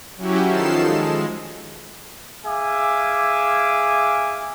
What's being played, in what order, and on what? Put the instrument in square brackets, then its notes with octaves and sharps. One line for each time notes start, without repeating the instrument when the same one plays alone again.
[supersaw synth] F#3 C#4 E4 F#4 G4
D#3 F3 A4 C7 E7
G#3
[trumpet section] G#4 E5 F5 G#5 D6